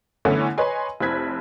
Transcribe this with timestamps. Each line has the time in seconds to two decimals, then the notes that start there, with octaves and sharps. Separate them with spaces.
0.25 D3 E3 A3 B3 C#4 E4
0.58 B4 C#5 D#5 G#5 C6
1.00 F1 C4 E4 F#6 G#6 B6